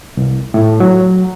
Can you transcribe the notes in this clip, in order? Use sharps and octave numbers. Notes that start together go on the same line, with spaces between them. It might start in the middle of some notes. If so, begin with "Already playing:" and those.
C2
A2
F#3